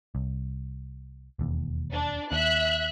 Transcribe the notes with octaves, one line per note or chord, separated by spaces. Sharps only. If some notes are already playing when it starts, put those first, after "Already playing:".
C2
E1 D#2
D4
D#2 E5 F#6